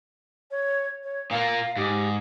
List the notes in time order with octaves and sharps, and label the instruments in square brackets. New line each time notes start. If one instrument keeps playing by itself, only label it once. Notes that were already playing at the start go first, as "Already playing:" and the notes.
[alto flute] C#5
C#5
[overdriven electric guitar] A#2 A#3 [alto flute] F5
[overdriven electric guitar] G#2 [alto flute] G4